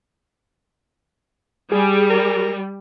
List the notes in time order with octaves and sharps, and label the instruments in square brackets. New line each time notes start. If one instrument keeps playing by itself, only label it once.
[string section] G3 [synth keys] G#4
[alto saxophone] A#4